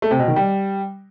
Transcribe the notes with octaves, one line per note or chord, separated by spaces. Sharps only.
A3
C3
B2
D#3
G3